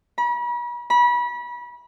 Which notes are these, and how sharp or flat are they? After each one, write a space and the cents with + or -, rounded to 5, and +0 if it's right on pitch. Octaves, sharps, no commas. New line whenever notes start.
B5 -40
B5 -30